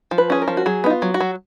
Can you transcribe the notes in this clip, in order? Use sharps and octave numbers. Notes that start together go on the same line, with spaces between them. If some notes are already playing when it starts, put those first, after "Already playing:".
F3
B4
C#4 G#4
A#4
F3
F#4
F#3 G#4
B3 D#4
F4
F#3
F#4
F#3